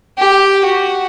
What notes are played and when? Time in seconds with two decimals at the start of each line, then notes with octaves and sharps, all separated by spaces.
0.18 G4
0.66 F#4